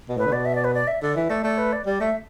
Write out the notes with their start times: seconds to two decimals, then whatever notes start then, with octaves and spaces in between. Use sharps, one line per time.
0.09 B2
0.17 A2 B4
0.26 D3
0.32 B2 D5
0.46 E5
0.55 D5
0.64 B4
0.74 D5
0.87 E5
1.02 D3 D5
1.16 E3 E5
1.30 A3 D5
1.44 A3 D5
1.58 B4
1.73 D5
1.86 G3 D5
2.00 A3 E5